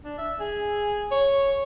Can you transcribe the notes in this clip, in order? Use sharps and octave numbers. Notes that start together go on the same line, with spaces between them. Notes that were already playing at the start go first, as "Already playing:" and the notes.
D4
E5
G#4
C#5